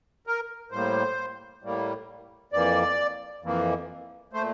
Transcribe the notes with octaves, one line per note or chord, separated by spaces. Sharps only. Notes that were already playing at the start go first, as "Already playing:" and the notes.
A#4
A2 G3 A#3 C5
A2 G3 A#3
F2 E3 A#3 D5
F2 E3 A#3
A#2 A3 C5